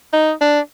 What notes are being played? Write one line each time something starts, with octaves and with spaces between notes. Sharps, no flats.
D#4
D4